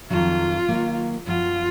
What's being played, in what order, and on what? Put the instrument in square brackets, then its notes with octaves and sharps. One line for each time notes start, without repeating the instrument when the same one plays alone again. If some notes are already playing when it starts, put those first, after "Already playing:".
[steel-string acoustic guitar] F2 D#3 F#3 [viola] F4
[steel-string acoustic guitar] D#3 F#3 A#3
[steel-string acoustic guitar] F#2 F3 B3 F#4 [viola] F4